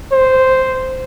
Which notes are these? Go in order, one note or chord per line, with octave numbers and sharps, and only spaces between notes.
C5